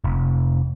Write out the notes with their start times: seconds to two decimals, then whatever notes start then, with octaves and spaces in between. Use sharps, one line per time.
0.04 F1